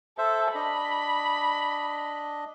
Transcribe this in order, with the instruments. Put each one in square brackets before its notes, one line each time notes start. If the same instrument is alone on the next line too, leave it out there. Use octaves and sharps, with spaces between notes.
[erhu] A4 [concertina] C5 E5
[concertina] D4 D#5 [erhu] B5